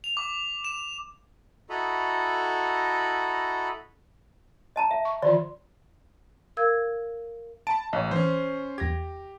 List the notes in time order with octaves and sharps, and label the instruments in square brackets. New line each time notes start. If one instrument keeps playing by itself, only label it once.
[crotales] F7
D6
E7
[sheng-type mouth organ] E4 F#4 A4 D#5 A#5 B5
[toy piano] D#5 A5 A#5
E5
[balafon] C#6
[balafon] D#3 E3 C6 [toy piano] F4 D5
[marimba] A#4 F5 E6 G#6
[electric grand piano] A5 [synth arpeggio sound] B5 D7
[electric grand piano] A1 [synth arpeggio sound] C#5 D#5
[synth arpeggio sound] E3 [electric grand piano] C#4 C5
[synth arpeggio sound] E2 G#6 [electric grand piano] G4 A#6